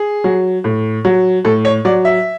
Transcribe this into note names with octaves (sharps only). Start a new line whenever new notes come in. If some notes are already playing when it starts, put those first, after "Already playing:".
Already playing: G#4
F#3
A2
F#3
A2 A4
C#5
F#3 D5
E5